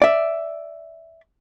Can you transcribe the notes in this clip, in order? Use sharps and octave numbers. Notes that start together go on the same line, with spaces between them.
D5 E5